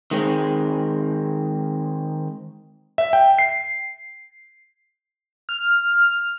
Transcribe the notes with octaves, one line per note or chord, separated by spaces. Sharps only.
D#3 G#3 C4
E5
G5
C7
F6